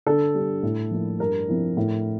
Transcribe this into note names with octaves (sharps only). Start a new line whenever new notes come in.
D3 A4
G3 D4
A2
F3 A#3 E4
G2 A#4
F3 C4 E4
A2